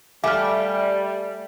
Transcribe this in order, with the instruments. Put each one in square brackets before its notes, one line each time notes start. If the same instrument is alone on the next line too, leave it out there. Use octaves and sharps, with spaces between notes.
[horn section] G3 [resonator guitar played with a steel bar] A3 [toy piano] E5 F5 G#5 [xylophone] D6 F6